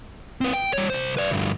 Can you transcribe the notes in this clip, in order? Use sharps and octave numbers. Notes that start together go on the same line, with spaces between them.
C4 B4
G5
G3 C#5
C2 C5
B4 D5
D2 G2